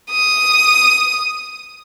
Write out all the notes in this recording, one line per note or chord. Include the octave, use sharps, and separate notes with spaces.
D#6